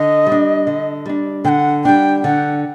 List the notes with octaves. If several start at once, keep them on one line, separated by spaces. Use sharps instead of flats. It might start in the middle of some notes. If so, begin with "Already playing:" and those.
Already playing: D3 D#5
G3
D4
D3
G3 D4
D3 F#5 G5
G3 D4 G5
D3 F#5